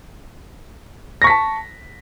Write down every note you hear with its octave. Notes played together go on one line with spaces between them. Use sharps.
A5 C#6 A#6 B6